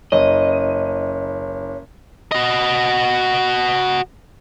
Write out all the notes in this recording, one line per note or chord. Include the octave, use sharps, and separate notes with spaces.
F#1 C#5 D#5
F#4 D#5